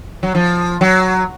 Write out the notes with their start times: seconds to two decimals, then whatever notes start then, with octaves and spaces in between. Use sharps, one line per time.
0.23 F#3
0.35 F3
0.81 F#3